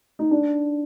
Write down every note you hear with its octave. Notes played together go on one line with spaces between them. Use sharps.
D#4
D4